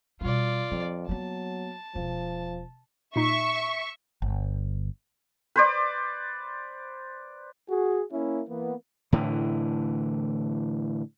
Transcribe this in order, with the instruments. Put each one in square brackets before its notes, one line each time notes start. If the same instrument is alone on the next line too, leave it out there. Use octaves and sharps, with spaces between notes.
[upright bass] B2 G3 [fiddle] F4 D5
[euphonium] F2 [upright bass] F3
[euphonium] F#3 [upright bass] A#3 B3 [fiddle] A5
[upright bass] E1 [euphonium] F3
[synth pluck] A#2 D#4 B6 [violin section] E5 C#6
[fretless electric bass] G1
[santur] B4 C5 D5
[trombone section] F#4 G#4
A#3 C#4 E4
E3 A#3 B3
[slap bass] A2 D3 E3